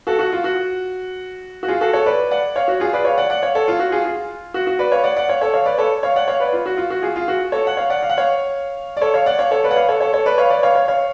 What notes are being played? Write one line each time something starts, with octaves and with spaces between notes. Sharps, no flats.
F#4 A4
F#4
F4
F#4
F#4
F4 G#4
F#4 A4
A4 C#5
B4 D5
D5 F#5
C#5 F5
F#4
F4 G#4
B4 D5
C#5 F5
D5 F#5
D5 F#5
C#5 F5
A4 C#5
F4
F#4
F4 G#4
F4
F#4
F#4
B4 D5
C#5 F5
D5 F#5
D5 F#5
C#5 F5
A4 C#5
C#5 F5
B4 D5
A4 C#5
C#5 F5
D5 F#5
C#5 F5
B4 D5
F4
F#4
F4
F#4
F4 G#4
F4
F#4
A4 C#5
F#5
C#5 F5
D5 F#5
F5
F#5
C#5 F5
D5
A4 C#5
C#5 F5
D5 F#5
C#5 F5
A4 C#5
B4 D5
F#5
C#5 F5
A4 C#5
A4 C#5
A4 C#5
B4 D5
C#5 F5
B4 D5
C#5 F5
C#5 F5
C#5 F5